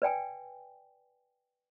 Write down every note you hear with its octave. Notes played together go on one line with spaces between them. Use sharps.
B4 D5 G5 G#5